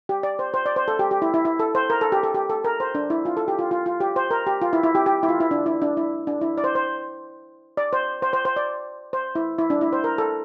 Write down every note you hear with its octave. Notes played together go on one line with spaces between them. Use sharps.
G4
D5
C5
C5
D5
C5
A4
G4
G4
E4
E4
E4
A4
C5
A#4
A4
G4
A4
G4
A4
A#4
C5
D4
E4
F4
A4
G4
F4
F4
F4
G4
C5
A#4
G4
F4
E4
E4
G4
G4
E4
F4
E4
D4
E4
D4
E4
D4
E4
D5
C5
C5
D5
C5
C5
C5
C5
D5
C5
E4
E4
D4
E4
C5
A#4
A4